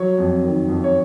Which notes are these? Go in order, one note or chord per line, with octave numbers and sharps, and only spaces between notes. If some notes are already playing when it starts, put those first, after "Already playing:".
Already playing: F#3 C#5
F2
D#3
F2
C#5